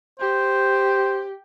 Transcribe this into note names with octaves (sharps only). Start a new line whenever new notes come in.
G4 C5